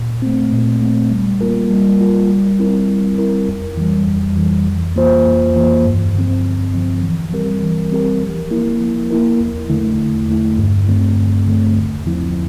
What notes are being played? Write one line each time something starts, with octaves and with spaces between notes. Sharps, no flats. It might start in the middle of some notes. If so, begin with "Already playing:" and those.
Already playing: A#2
A3 C4
A#2
A3 C4
G3
A#3 F4 A#4
G3
A#3 F4 A#4
G3
C4 E4 A#4
G3
C4 E4 A#4
F2
E3 G3
F2
E3 G3
F2
E3 A#3 F4 C5
F2
E3 A#3 F4 C5
G2
D3 F3 C4
G2
D3 F3 C4
E3
G3 C4 G4 A#4
E3
G3 C4 G4 A#4
F3
A#3 E4 A#4
F3
A#3 E4 A#4
E2
D3 A3 E4
E2
D3 A3 E4
G2
D3 A3 C4
G2
D3 A3 C4
E2
D3 F3 C4 E4